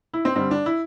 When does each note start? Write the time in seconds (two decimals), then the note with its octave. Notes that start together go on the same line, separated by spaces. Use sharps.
0.13 E4
0.25 C4
0.35 G2 D3 G3 C4
0.51 D4
0.66 E4